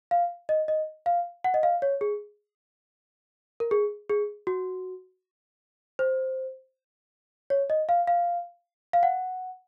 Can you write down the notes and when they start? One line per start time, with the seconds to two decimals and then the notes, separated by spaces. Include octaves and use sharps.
0.11 F5
0.49 D#5
0.68 D#5
1.06 F5
1.44 F#5
1.54 D#5
1.63 F5
1.82 C#5
2.01 G#4
3.60 A#4
3.71 G#4
4.09 G#4
4.47 F#4
5.99 C5
7.50 C#5
7.70 D#5
7.89 F5
8.07 F5
8.93 F5
9.03 F#5